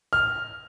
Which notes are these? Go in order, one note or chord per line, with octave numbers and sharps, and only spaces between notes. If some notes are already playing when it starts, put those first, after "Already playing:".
F6